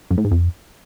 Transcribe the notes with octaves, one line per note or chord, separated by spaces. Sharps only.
F#2
A2
G#2
F2